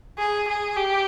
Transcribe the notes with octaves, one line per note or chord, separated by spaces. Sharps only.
G#4
G#4
G4